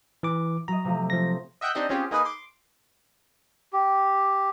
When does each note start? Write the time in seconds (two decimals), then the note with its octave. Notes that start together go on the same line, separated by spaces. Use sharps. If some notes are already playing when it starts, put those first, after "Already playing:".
0.23 E3 D6
0.68 F#3 D#5 A#5
0.85 C3 F3 A3
1.10 F3 C5 A#6
1.61 D#5 E5 F#5 G5 F#6 G6
1.75 C4 D4 D#4 G4 D#5
1.89 C4 C#4 F4 G4 G#4
2.11 A#3 D#4 G#4 B4 D#5 G#5
2.25 C6 D6
3.73 G4